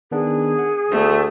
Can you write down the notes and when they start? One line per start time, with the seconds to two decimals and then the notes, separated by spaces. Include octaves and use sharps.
0.12 D#3 B3 D4 G#4
0.59 F#5
0.91 D2 A3